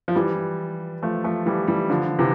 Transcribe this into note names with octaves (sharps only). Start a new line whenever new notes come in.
F3
E3 G3
F3 A3
F3 A3
E3 G3
E3 G3
D3 F3
C3 E3